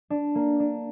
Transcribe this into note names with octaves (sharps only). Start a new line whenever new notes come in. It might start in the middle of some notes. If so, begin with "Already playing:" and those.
D4
A#3
D4